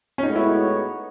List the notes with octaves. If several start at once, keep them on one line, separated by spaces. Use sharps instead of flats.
C#4
A2 G#3 B3 D#4 F#4 C#5
E4
D#4